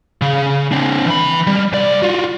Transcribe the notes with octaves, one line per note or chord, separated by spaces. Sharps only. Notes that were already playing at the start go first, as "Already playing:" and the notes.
C#3
C4 D4
E3 B5
G3
C2 D5
F4 F#4